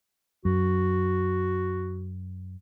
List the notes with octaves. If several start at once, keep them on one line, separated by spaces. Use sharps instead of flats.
F#2 F#4